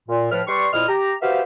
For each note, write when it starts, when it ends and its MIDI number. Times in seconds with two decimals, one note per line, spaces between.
0.09 0.27 46
0.31 0.41 45
0.31 0.41 53
0.31 0.41 71
0.31 0.41 89
0.48 0.68 55
0.48 0.68 71
0.48 0.68 74
0.48 0.68 84
0.48 0.68 85
0.73 0.84 41
0.73 0.84 46
0.73 0.84 64
0.73 0.84 75
0.73 0.84 89
0.88 1.13 67
0.88 1.13 82
1.22 1.41 66
1.22 1.41 67
1.22 1.41 71
1.22 1.41 72
1.22 1.41 76
1.22 1.41 77